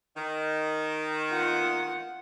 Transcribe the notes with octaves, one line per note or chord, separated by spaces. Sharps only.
D#3
F4 F#5